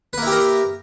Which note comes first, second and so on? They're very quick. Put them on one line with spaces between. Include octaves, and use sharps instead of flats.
B4 A#3 E4 G4 A#4